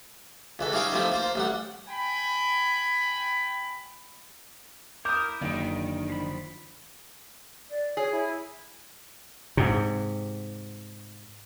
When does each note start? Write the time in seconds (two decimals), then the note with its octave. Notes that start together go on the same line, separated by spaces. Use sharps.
0.59 C#2 E3 A4
0.72 G3 C#4 D#4 E4 F5 G5
0.92 D#3 F3 G3 A3 C4 E4
1.12 A#3 F4 C5
1.35 A1 G3 F#5
1.88 G5 G#5 B5
5.05 E4 A#4 D6 D#6 F6 G6
5.41 F#1 D3 D#3 D7
6.10 F3 B5
7.69 D5
7.97 G#4 C#5
8.11 E4
9.57 G#2 C3